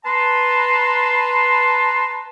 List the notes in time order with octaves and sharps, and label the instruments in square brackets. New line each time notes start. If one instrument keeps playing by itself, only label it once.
[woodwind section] B4 A5 A#5 C6